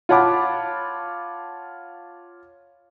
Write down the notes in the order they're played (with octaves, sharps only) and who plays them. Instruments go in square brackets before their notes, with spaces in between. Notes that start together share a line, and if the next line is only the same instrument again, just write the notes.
[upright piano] F4 C#5 F#5 A5 B5 D6